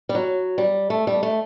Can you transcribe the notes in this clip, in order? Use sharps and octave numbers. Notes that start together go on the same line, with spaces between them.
G3
F#3
G3
A3
G3
A3